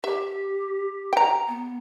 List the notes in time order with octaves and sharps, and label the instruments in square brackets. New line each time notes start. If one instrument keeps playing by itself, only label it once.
[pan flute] G4 [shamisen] E5
[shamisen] G5 A#5
[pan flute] B3